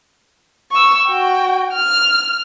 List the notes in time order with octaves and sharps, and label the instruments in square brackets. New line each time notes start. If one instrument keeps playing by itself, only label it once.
[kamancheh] C#6 E6
F#4 G5
F6